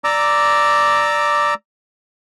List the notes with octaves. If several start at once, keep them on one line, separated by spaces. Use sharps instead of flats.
D5 A#5 D6 E6